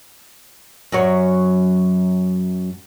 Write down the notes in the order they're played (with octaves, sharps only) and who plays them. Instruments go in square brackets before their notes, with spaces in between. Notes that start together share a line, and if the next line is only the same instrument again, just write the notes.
[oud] F#2 F#3 C#5